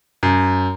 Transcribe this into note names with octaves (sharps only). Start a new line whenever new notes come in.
F#2